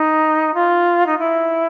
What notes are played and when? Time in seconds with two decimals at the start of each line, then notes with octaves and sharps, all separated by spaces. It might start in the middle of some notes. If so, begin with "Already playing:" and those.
Already playing: D#4
0.54 F4
1.06 D#4
1.18 E4